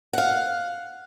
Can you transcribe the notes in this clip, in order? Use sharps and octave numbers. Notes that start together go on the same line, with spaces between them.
F5 F#5